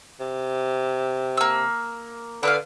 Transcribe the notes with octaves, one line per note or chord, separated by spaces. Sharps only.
C3
A#3 E6
D3 B3 B4 F5